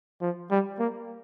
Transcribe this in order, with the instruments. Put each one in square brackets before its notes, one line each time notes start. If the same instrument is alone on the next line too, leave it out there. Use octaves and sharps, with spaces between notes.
[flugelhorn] F3
G3
A#3